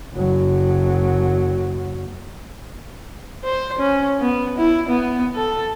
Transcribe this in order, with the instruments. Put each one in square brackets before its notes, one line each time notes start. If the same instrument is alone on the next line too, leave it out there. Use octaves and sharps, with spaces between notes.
[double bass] F#1 F#3
[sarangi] C5
C#4
B3
E4
B3
A4